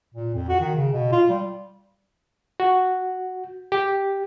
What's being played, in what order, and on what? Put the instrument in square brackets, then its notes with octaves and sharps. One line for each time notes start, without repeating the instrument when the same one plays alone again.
[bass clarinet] A#2
F2
F#4
D#3
C#3
B2
F4
G3
[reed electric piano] F#4
G4